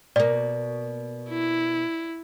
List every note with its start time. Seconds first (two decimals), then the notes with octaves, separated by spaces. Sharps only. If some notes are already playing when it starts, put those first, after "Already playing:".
0.16 B2 A#3 D5
1.30 E4